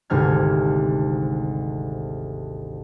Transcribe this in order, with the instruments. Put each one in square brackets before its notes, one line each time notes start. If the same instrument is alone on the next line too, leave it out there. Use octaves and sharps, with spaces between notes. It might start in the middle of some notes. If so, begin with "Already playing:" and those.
[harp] G#1 D2 G#2 C3 F6 G#6